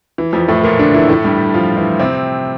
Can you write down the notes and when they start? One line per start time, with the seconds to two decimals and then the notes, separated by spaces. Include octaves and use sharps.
0.18 E3
0.33 F2 F3
0.48 A2 A3
0.64 A#2 A#3
0.79 D3 D4
0.94 E3 E4
1.09 A2 A3
1.24 G2 G3
1.54 F3 F4
1.77 E3 E4
1.99 C3 C4